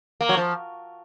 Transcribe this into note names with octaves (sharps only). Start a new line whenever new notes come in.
A#3
F#3
F3